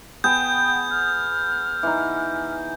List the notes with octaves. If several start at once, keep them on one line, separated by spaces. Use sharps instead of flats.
B3 G#4 F#5 G5 G6
F6
E3 D#4